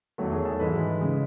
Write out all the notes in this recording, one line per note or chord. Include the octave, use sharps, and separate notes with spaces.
E2 D#3 F#3 A3
G#4
A4
G#2 E3 G#3 B4
C#3 G#3